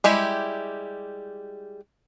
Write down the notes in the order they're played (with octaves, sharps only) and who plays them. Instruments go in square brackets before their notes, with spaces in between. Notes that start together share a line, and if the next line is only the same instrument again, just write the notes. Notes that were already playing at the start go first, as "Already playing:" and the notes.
[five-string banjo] G3 G#3 E4 G4